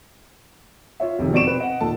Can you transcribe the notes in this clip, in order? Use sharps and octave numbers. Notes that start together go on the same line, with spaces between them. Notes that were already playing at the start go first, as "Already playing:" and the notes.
F4 C#5 E5
F1 C3 D#3 F3 G#4
B2 C5 D5 C#6 D7 E7
C4 B4
D#5 F#5
D#2 A#2 A4 A5